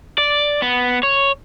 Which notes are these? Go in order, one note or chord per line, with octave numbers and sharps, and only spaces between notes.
D5
B3
C#5